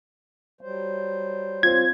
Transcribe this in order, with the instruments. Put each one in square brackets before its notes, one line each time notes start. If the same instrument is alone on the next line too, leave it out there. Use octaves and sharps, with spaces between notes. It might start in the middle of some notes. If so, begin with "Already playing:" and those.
[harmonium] F#3 G3 C5
[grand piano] C4 F4 [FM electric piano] G#6